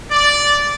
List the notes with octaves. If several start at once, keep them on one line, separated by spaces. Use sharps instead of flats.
D5